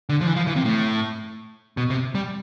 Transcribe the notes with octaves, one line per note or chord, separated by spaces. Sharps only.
D3
F3
E3
F3
E3
C3
A2
B2
C3
G3